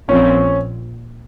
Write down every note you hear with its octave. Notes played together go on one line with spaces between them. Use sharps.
A#1 A#2 F3 C4 C#4